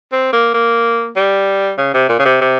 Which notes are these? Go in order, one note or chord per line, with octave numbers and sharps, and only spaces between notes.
C4
A#3
A#3
G3
C#3
C3
A#2
C#3
C3
C3